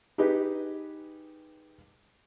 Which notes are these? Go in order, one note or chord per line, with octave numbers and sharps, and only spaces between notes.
D#4 G4 G#4 B4 D#5